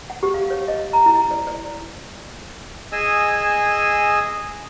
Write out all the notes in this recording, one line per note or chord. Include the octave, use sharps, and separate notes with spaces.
F#5
G4
F5
C#5
D#5
A#5
E4
D5
D5
G#4 D#5 G#5 E6